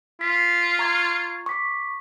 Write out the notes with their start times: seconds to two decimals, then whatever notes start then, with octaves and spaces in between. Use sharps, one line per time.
0.21 F4 B6
0.79 A#5 C#6 G#6
1.46 C#6 D6 B6